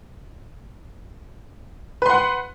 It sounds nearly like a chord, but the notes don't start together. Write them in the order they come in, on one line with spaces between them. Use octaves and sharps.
B4 C6 F#5